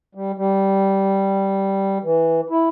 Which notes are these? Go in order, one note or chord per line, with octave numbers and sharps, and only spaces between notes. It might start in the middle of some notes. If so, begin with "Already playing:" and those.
G3
G3
E3
E4